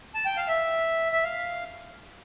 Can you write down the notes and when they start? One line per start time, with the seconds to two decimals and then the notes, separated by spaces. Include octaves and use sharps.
0.14 A5
0.25 G5
0.37 F5
0.48 E5
1.12 E5
1.24 F5